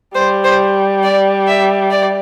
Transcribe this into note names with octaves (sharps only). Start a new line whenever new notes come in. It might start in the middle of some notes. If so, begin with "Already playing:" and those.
G3 C5
C5
D5
E5
D5